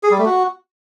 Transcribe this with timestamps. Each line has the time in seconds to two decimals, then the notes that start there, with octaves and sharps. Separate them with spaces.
0.03 G#4
0.11 G3
0.18 A3
0.26 F#4